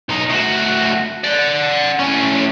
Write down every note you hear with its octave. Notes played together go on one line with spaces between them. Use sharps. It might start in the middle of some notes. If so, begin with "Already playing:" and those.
B1 D#4
A2 F#4
D5 F#5
A2 C#4